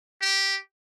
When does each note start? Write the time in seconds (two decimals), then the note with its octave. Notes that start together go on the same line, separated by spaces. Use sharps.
0.21 G4